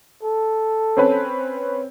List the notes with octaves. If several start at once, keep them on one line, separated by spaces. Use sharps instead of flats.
A4
C4 C#4 B4